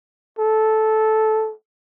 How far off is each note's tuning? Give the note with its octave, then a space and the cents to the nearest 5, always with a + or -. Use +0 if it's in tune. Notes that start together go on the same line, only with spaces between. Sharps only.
A4 -10